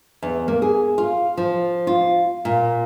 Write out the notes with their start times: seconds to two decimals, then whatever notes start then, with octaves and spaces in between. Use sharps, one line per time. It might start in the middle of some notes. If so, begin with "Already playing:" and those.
0.22 E2
0.48 A#3
0.62 G#4
0.98 F4
1.37 F3
1.87 F4
2.45 A#2